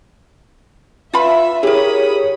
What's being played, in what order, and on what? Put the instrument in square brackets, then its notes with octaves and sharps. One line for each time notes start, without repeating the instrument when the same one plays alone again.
[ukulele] F4 B4 B5 [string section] E5
[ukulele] E4 A#4 [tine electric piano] G4 G#4 [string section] C#5 B5 D#6